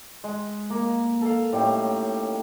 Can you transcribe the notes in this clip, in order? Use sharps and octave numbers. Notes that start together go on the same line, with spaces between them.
G#3
A#3
A4 F5
A2 G3 C#4 D#4